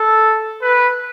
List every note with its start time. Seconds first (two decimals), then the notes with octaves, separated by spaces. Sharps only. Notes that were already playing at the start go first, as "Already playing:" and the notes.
Already playing: A4
0.62 B4